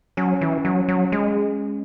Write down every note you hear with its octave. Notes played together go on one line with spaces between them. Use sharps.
F#3 C#4
E3
F#3
F#3
G#3